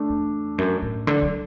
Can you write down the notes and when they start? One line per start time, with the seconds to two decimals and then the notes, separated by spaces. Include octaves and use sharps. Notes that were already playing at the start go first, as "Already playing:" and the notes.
Already playing: A3 D4
0.10 E2
0.58 F#2
0.82 A2
1.07 D3
1.22 F#3